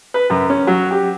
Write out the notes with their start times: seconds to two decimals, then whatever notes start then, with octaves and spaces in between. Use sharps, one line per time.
0.14 B4
0.30 F#2
0.50 C#4
0.67 F#3
0.91 G4